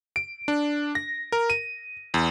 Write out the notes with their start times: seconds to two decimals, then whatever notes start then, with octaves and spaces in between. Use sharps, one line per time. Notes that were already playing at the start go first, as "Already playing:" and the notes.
0.16 D7
0.48 D4
0.95 A#6
1.32 A#4
1.50 D#7
2.14 E2